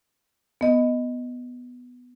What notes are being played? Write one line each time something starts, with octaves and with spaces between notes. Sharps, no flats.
B3 D#5